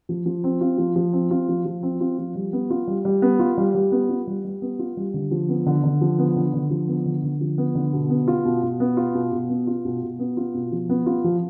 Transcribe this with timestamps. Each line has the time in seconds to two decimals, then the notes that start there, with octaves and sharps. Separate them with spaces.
0.09 F3
0.26 F3
0.44 C4
0.61 F4
0.78 F3
0.96 F3
1.13 C4
1.31 F4
1.48 F3
1.65 F3
1.83 C4
2.01 F4
2.18 F3
2.35 G3
2.53 B3
2.70 F4
2.87 G3
3.05 G3
3.22 B3
3.39 F4
3.57 G3
3.75 G3
3.92 B3
4.09 F4
4.27 G3
4.44 G3
4.62 B3
4.79 F4
4.97 G3
5.14 D3
5.31 F3
5.49 B3
5.66 D3
5.84 D3
6.01 F3
6.19 B3
6.36 D3
6.54 D3
6.70 F3
6.88 B3
7.06 D3
7.23 D3
7.41 F3
7.58 B3
7.75 D3
7.93 B2
8.10 B3
8.28 F4
8.45 B2
8.63 B2
8.80 B3
8.97 F4
9.15 B2
9.32 B2
9.50 B3
9.67 F4
9.85 B2
10.02 B2
10.19 B3
10.37 F4
10.54 B2
10.72 F3
10.90 B3
11.06 F4
11.24 F3